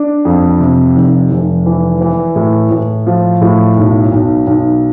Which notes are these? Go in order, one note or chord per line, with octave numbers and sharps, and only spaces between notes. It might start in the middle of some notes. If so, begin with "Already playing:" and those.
Already playing: D4
F2
C3
F1
F1
E3
E3
A2
A2
F3
A2
B1
B1
B1